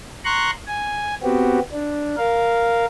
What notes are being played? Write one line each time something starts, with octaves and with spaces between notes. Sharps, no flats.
A#5 C6 C#6 F#6
G#5
B3 C4 F#4 G4
D4
A#4 F5